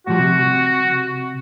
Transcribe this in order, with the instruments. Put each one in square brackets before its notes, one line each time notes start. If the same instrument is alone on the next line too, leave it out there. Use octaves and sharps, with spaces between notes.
[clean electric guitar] A2 F3 G3 [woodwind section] F#4
[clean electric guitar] C3